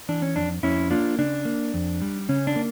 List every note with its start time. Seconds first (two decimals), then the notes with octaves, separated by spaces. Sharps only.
0.09 E3 D4
0.22 C#4
0.36 F2 D4
0.63 F2 C#4 E4
0.91 A#3 D4 F4
1.18 C#3 D4
1.45 A#3
1.74 F2
2.02 G3
2.29 C#3 C#4
2.47 D4
2.56 A#3